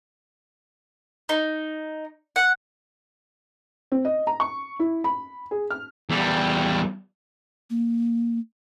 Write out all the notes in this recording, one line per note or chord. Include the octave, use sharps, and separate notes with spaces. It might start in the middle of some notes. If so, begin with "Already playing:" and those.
D#4
F#5
C4
D#5
A#5
C#6
E4
B5
G#4
F6
E2 G3
A#3